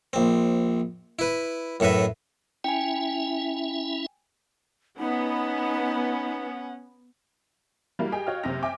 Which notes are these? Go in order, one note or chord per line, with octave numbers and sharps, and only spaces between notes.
A#1 C4
E4 B4
F#2 A2 A4 B4 E5
C#4 E4 E5 G5 G#5
B3 C#4 D#4 F#5
G3 A#3 E4 F#4
G4 G#4 D#5 G5 G#5
F#4 C#5 D#5 F5 G5 F6
F#1 C3 C4 G4 A#6 F7
E5 G5 G#5 D6